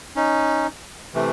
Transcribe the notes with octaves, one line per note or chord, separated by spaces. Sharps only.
C#4 D#4
C3 E3 A3